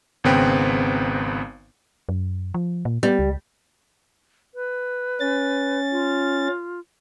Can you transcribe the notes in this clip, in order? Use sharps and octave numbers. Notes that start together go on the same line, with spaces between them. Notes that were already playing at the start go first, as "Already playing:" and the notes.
G#1 C#3 B3 C4 B4 G5
F#2
F3
A#2
G3 B3
C#2
B4
C#4 A6
F4